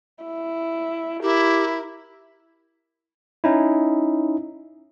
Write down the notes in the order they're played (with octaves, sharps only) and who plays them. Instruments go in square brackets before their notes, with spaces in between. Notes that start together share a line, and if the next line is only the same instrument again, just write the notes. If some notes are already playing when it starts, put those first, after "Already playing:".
[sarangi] E4
[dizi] E4 [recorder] G4 [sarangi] A#4
[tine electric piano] C#4 D#4 E4